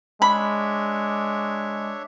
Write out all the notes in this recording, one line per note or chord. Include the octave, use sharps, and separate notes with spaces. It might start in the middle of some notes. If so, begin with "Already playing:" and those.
G#3 D4 C#5 E5 B5